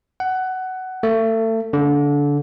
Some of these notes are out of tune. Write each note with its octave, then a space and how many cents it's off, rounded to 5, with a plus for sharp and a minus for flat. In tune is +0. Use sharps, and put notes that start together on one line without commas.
F#5 +15
A3 +30
D3 -25